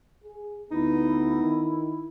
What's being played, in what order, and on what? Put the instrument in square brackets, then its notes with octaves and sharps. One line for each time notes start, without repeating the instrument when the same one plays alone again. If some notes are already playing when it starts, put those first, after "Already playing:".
[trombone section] G#4
[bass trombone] D2 [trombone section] B3 [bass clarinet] D#4 [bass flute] E4
[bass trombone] D#3